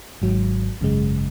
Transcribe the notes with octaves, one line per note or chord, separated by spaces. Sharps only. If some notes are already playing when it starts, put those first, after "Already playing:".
G#1 G#2 F#3
G#1 F#2 C#3 G#3